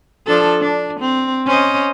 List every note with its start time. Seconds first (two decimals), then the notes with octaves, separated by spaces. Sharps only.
0.27 F3 D4 A4
0.60 D4
1.00 C4
1.46 C#4 C5 D#5